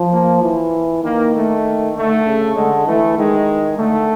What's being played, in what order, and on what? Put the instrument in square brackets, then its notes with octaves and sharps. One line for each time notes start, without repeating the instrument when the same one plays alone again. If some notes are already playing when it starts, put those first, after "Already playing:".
Already playing: [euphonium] F3
[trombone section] A#3
[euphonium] E3
[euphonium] D#3 [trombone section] A#3
[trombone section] A3
[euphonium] D3 [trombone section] A3
[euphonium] C#3
[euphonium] D3 [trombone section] G#3
[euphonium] E3 [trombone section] A3
[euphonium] D#3 [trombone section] G#3
[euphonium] D3 [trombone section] A3